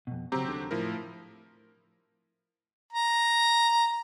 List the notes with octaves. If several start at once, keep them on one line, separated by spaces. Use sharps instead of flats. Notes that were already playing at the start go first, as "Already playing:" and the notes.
F2 B2
C#3 F#3 C4 G4 A#5
D#2 D4 A4
A2 F3 E4 A#4
A#5